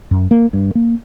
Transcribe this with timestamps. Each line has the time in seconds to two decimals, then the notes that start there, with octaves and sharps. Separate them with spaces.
0.11 F#2
0.31 A#3
0.53 G2
0.75 A#3